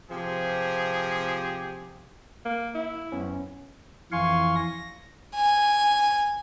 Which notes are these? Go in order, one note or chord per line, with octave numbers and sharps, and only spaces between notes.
C3 F3 G4 G#4
A#3
E4
F#2 B3 C#4
F2 E3 F5 G#5 C6 C#6
A#6
G#5